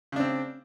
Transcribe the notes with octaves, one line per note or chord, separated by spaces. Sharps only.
C#3 C4 D4